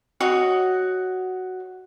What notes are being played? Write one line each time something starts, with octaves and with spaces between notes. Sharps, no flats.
F#4 C#5 D#5